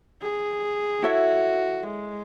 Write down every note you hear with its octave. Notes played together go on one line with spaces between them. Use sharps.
G#4
E4 F#4 A4 C#5 E5
G#3